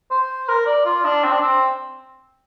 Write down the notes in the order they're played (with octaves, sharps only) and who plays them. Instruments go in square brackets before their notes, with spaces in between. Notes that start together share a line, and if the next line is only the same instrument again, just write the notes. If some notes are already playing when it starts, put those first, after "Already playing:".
[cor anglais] C5
A#4
D5
F4
D4
C4
D4
C4